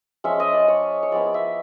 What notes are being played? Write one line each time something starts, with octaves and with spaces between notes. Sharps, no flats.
F3 G#3 C#4 E5
D#5
D5
C#5
C#5
F3 G#3 B3 E4 D5
E5